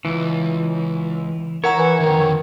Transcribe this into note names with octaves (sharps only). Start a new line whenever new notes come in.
C#2 E3
E4 A#4 C#5 F#5 A#5
E3
F2 D3 D#3